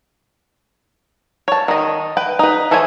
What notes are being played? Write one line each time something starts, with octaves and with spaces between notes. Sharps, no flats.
C#5 A5
D#3 D#5
B4 G5
D#4 B4
E3 A4 C5 C#5 G#5